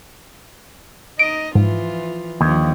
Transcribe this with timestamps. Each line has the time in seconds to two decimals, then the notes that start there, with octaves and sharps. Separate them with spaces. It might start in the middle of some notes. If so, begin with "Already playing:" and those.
1.19 D#4 D#5 D7
1.55 G#2 E3 F3 F4
2.41 D#2 D3 F3